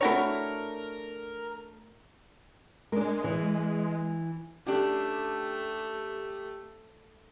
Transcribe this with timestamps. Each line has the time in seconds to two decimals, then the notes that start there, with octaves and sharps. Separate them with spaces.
0.01 A3 D4 E4 F#4 A#4 C#5
2.92 G#3 D4 A#4
3.24 E3
4.67 A3 C#4 D4 G4